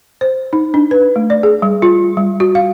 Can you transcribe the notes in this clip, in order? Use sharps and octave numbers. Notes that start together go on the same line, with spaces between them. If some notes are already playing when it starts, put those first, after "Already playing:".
C5
D#4
D4
B4
A3
D5
G#4
G3
F4
G3
F#4
F5